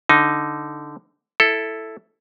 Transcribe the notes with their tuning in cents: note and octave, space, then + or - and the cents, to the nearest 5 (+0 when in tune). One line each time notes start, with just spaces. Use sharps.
D3 +0 D#4 +0
E4 +0 A4 +0